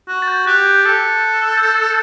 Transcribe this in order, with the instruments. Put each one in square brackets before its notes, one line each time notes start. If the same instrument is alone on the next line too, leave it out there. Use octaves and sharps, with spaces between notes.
[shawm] F#4
[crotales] A6
G6
[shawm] G4 [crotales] F#6
[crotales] G6
[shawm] A4
[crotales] G6
A6